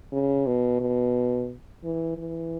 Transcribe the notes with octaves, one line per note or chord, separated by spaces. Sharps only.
C#3
B2
B2
E3
E3